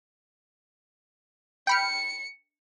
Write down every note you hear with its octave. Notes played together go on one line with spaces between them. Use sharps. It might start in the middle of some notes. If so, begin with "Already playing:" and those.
G5 B5 F6 C#7